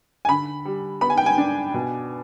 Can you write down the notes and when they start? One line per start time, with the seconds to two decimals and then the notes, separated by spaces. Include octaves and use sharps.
0.25 G#5
0.29 D3 B5
0.65 G3
1.01 B3 B5
1.10 G#5
1.18 G5
1.26 G#5
1.38 D4
1.74 B2